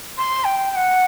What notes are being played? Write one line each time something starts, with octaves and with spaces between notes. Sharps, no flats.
C6
G5
G5
F#5